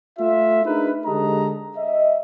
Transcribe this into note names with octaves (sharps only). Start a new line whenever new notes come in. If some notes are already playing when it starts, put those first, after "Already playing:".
A3 F4 E5
D4 D#4 G#4 A#4 B4
D3 G#3 G4 A4 D#5 A#5
D#5 E5